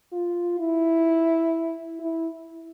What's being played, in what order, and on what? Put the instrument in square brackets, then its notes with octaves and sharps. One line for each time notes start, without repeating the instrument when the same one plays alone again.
[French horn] F4
E4
E4